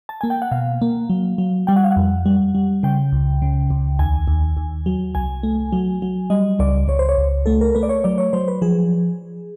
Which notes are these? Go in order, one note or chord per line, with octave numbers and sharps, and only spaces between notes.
A5
A#3 G#5
G5
F#5
B2 F5
A#3
F#3
F#3
G3 G5
F#5
F5
F#5
F2
G3
G3
C#3 G5
C#2
C#3
C#2
D#2 G#5
D#2
D#2
F#3
C2 G#5
A3
F#3
F#3
G3 D#5
C#2 D5
C#2 C#5
C5
C#5
C#2
A3 A4
A#4
A3 B4
D5
C#5
F#3 D5
C#5
F#3 C5
B4
F3 G#4